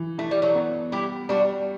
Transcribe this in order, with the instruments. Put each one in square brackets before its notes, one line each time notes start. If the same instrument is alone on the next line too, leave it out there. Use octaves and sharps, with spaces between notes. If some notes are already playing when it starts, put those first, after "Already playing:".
Already playing: [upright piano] E3
[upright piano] E3 [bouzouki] A3
[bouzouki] G3
F#3 A3
[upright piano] B3
[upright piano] G3 [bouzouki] E4 G4
[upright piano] G3 [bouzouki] D4 F#4